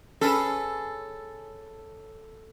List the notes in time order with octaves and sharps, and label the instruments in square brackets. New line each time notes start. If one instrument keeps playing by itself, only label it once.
[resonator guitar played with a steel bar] C#4 G#4 B4 [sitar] A4